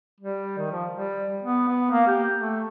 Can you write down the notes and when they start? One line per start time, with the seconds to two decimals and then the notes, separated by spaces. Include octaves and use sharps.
0.20 G3
0.58 D#3
0.72 F3
0.93 G3
1.42 B3
1.68 B3
1.91 A#3
2.07 G4
2.37 A3